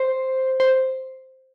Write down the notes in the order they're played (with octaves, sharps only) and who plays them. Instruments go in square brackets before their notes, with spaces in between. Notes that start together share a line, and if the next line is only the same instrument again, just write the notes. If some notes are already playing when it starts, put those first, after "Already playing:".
Already playing: [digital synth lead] C5
C5